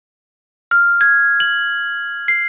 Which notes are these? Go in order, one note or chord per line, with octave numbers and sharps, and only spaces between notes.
F6
G#6
F#7
C7